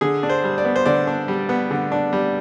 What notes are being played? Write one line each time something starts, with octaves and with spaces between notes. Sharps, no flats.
D3 G#4
D4
C5
G3
D5
B3
C5
D3 D5
D4
G3
B3
D3
D4
G3